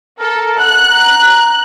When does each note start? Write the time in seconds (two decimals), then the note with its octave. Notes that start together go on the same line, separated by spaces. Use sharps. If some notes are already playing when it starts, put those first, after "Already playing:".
0.19 A4 A#4
0.59 F#5 F#6
0.91 A#5